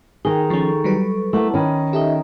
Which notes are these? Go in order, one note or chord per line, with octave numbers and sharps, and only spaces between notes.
D#3 D#4 G#4 A#4 G5
F3 C#4 A4 C#6
F#3 G3 B4
A3 A#3 E4 F#5 A5
D#3 C#4 B5
D#4 G4 A4 D#5 E5